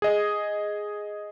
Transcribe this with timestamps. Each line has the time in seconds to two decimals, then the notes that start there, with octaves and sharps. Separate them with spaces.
0.02 G#4 D#5